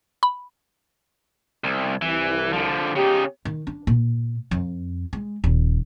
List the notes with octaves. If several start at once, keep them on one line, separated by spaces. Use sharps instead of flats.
B5
C2
C2 E3
D3 F3
C#3 D#4 G4
D#3
D4
A#2
F2
G#3
D#1